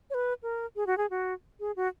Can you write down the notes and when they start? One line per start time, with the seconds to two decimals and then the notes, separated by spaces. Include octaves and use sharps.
0.10 C#5
0.14 B4
0.43 A#4
0.76 G#4
0.87 F#4
0.98 G#4
1.10 F#4
1.60 G#4
1.76 F#4